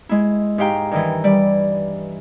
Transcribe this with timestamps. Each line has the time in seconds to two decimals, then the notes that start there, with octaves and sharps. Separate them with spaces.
0.09 G#3 E4
0.58 G#2 G4 F5 G5 A#5
0.91 G2 D#3 E3
1.24 G3 D5